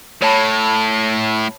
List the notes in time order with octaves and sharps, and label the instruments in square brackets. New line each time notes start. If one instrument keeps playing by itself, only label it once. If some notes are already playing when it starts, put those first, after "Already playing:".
[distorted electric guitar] A2 [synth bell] C#5 A5 B5